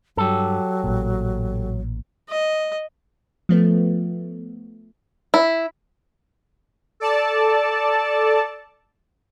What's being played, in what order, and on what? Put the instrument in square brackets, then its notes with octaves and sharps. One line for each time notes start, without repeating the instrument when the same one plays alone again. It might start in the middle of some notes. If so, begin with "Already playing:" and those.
[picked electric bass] G2 [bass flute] F#3 [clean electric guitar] G4 A4
[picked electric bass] A1 A#2
[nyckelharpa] D#5
[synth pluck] F3 A3 B3
[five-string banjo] E4
[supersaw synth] A4 D5 A5